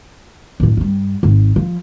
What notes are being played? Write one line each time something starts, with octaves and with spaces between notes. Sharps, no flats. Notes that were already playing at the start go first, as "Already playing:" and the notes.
A1 F#2
G2 G3
G#1
F3